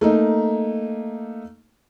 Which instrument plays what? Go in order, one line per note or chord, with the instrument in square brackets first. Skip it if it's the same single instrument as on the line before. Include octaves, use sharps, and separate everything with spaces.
[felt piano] A3 A#3 D#4